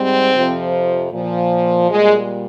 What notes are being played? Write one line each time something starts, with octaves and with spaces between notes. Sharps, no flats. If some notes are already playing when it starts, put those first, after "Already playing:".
Already playing: G#2 G3 C4
F2 C3 F3
A#2 F3
A#2 G3 G#3